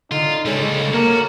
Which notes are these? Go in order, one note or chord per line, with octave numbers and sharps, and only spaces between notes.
D3 D#4 F4
C#2 G3 G#3 A4 C#5
A#3 F#4 A#4